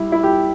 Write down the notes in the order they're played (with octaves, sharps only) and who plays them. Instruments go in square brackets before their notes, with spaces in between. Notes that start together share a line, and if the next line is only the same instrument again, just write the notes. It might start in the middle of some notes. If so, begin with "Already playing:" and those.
Already playing: [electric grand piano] G3 [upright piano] E4
[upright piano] E4
G4